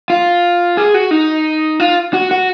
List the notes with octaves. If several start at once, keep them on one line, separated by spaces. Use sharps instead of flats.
F4
G#4
F#4
D#4
F4
F#4
F#4